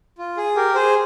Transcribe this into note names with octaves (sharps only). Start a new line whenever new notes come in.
F4
G#4
G4 A#4
G#4 C5